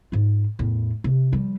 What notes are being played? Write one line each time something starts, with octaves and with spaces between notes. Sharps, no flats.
G#2 F4
E2 A2
C3
F3 G3